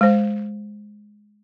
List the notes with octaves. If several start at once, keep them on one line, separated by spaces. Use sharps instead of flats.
G#3 C5